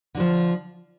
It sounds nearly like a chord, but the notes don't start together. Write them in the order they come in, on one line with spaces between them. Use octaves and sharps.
D3 F#3 F3